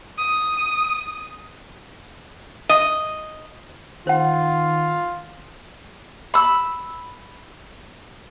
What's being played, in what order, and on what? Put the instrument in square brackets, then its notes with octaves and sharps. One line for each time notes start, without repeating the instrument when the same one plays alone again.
[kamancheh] D#6
[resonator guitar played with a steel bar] D#5
[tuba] D#3 [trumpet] F4 [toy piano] C5 F#5
[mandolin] B5 E6